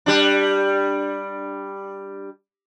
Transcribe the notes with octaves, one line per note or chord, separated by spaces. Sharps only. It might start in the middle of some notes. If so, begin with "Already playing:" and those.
G3 D4